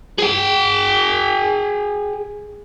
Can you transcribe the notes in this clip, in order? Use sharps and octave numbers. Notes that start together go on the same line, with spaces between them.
G#4 G5